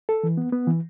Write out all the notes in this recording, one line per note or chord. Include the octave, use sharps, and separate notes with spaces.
A4
E3
B3
B3
E3